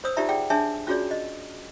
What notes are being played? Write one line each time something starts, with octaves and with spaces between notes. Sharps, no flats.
C5 C#5 D#6 E6
D#4 F4 G4 D5 E5 A#5
G#4 D5 F#5 G5
D4 G#4 C#5 E5 G#5 A5
C#4 F4 F#4 G#4 C#5 D5
D#5